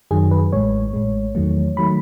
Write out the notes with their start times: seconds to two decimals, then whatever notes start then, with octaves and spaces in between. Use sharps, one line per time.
0.11 F#2 D#3 F#3 G#4
0.31 B4
0.52 A1 A2 G#3 C#5
0.93 A1 A2 G#3
1.35 E2 D#3 F#3 A3
1.77 D#3 F#3 A3 B5